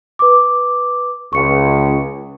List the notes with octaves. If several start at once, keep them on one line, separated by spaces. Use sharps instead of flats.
B4 D6
C#2 C#6 C#7